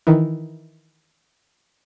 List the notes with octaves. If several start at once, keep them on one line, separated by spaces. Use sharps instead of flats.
D#3 E3